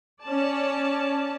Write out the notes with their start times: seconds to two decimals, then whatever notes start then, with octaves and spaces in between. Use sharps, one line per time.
0.23 C#4 D5 A5